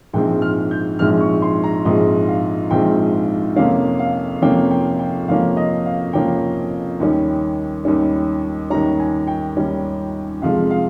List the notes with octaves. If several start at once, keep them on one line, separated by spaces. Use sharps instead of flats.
A#1 G#2 F3 G#3 C4 G5
F6
G6
A#1 G#2 F3 G#3 C4 F6
C#6
C6
A#5
A#1 G#2 F3 G#3 C4 D#5
F5
A#1 G#2 F3 G#3 C4 G5
F2 C3 F3 A#3 C#4 F5
F5
F2 C3 F3 A#3 C#4 G5
G5
G5
F2 C3 F3 A#3 C#4 F5
D#5
F5
F2 C3 F3 A#3 C#4 G5
D#2 D#3 G3 C#4
D#2 D#3 G3 C#4
D#2 D#3 G3 C#4 A#5
G#5
G5
D#2 D#3 G3 C#4
F2 C3 F3 G#3 F5
F5